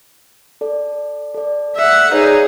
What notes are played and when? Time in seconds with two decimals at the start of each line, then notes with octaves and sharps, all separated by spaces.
0.61 A4 D5
1.34 A4 D5
1.76 E5 F#5
2.12 D#4 G#4 B4 C#5 D5